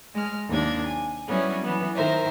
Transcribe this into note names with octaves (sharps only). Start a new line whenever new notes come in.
G#3 F6
D#2 C3 D4 G#6
G#5
F#3 G3 B3 C#4 E4
E3 B3
D#3 A#4 C5 E5